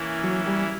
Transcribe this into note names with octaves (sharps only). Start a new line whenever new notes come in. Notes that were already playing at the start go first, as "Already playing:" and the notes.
Already playing: E3 A#3 C#4 E4
F#3
G3